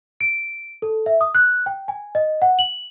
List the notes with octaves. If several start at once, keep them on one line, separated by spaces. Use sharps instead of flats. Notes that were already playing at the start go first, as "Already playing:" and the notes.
D7
A4
E5
D#6
F#6
G5
G#5
D#5
F#5
F#7